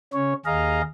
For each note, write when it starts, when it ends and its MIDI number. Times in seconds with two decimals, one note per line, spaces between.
0.13 0.33 49
0.13 0.33 61
0.13 0.33 73
0.45 0.82 39
0.45 0.82 68
0.45 0.82 75
0.45 0.82 77
0.45 0.82 82